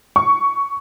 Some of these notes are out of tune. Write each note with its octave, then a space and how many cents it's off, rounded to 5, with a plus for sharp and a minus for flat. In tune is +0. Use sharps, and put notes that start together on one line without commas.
C#6 +15